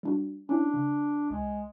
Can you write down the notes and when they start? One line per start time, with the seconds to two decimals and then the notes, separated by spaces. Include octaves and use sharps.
0.03 G3 D4 F#4
0.49 C#4 D4 E4
0.74 C#3
1.30 C2 G#3